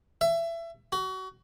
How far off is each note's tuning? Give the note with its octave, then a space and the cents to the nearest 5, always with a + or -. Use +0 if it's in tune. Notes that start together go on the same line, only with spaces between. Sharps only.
E5 +25
F#4 +30